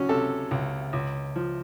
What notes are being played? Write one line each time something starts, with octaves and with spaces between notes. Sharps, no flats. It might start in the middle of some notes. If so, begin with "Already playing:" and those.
Already playing: C#2 F#3 C#4
C3 A4
C#2
C#2
F3